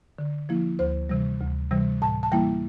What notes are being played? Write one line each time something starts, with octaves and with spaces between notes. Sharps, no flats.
D3
F3 A#3 E4
D2 C5
C3 E3 G3
D2
C3 E3 G3
A2 A5
A5
E3 G3 A#3 E4 G5